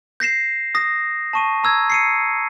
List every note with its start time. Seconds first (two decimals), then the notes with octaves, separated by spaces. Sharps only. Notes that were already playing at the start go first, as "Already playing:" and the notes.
0.20 G6 A#6 C7 E7
0.75 D#6 A#6
1.33 A5 C#6 D#7
1.64 A#5 E6 G#6
1.90 C7 C#7 D#7